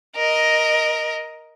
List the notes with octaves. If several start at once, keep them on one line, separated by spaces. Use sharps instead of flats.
A#4 D#5